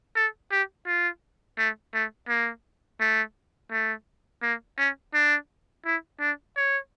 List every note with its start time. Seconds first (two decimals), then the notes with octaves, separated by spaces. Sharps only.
0.16 A4
0.51 G4
0.87 F4
1.58 A3
1.94 A3
2.29 A#3
3.00 A3
3.72 A3
4.43 A#3
4.78 C#4
5.14 D4
5.85 E4
6.20 D4
6.56 C#5